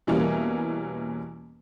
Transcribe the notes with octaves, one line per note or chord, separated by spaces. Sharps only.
E2 B2 E3 G3 A#3 C#4